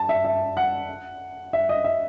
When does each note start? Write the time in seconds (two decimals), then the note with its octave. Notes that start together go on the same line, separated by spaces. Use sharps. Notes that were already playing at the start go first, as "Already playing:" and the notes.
Already playing: A5
0.09 E5
0.25 E5
0.57 F#5
1.53 E5
1.69 D#5
1.84 E5